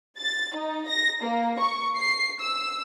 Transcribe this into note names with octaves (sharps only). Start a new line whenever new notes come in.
A6
D#4
A#6
A#3
C#6
C7
E6